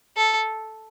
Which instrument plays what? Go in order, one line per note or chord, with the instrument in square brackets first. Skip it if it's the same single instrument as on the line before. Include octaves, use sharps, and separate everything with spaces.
[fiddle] A4